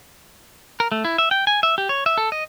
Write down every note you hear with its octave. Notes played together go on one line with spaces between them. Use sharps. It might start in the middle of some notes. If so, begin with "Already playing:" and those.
A#4
A3
E4
E5
G5
G#5
E5
G4
C#5
E5
A4
D#5